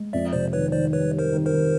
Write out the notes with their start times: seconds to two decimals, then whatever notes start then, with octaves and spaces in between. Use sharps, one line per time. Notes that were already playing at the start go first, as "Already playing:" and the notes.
Already playing: G#3
0.13 F2 D5 E5
0.33 C3 C5 D5
0.53 D#3 B4 C#5
0.72 D#3 C5 D5
0.93 G3 B4 C#5
1.12 G3
1.19 A#4 C5
1.32 D#3
1.46 A#4 C5
1.52 D#3